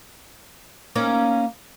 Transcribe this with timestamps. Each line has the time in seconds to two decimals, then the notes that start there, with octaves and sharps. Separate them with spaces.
0.95 A#3 C#4 D#4